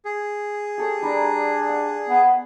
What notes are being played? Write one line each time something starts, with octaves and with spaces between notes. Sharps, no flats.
G#4
G4 A4 C#5
G3 D4 A#4 D5
F#5
B3